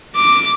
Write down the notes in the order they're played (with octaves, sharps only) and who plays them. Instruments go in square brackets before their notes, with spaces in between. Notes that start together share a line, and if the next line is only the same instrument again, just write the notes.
[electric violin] D6